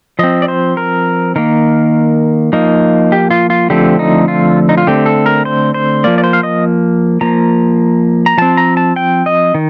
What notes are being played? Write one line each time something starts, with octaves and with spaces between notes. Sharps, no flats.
F3 C4 D#5
D5
C5
A#4
D#3 A#3 A#4
F3 A#3 D#4
G4
F4
F4
D3 F3 A3 C4 G4
D#4
F4
D#4
F4
D3 A3 C4 G4
A4
A#4
C5
C5
F3 A#3 D5
D5
C5
F5
D#5
F3 A#3 A#5
A#5
F3 C4 A5
A#5
A5
G5
D#5
D#3